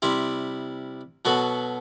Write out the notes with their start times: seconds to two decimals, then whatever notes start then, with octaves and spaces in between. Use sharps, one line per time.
0.02 C3 G3 C4 E4
1.25 B2 F#3 B3 F#4 A4